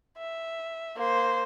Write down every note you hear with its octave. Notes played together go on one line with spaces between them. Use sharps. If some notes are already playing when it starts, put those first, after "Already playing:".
E5
A#3 C5